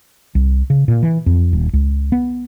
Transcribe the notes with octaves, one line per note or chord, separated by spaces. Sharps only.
C2
C#3
A#2
E3
F2
D#1
C#2
B3